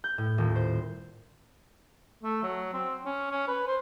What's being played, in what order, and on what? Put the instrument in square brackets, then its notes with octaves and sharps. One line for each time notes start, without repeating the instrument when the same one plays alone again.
[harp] G6
A2
D#1
C5
[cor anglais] A3
F#3
C4
C#4
C#4
B4
C5